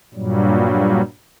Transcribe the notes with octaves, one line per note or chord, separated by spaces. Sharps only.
G2 A#2 F#3 G3